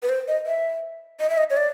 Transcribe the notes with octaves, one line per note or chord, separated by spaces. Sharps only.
B4
C5
D#5
E5
D#5
E5
D#5
C#5
D5